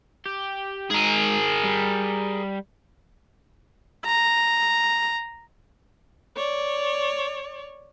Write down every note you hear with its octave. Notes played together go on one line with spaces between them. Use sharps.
G4
G#2 G#4 A#4
G3
A#5
C#5 D5